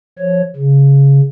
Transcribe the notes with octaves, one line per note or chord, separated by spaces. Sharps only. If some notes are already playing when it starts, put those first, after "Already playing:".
F3 C#5
C#3